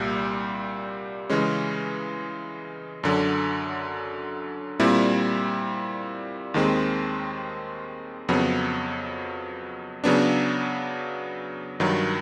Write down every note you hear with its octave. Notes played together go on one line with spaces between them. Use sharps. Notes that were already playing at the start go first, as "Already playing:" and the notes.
Already playing: C2 A#2 G3
C#3 E3 G#3 C#4
F#2 D3 F#3
A#2 G3 C4 E4
D#2 D#3 G#3 C4
F2 C#3 F#3 B3
C#3 F#3 B3 D4
G2 D#3 F#3